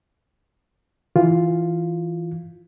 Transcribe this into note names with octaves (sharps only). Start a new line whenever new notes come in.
E3 F4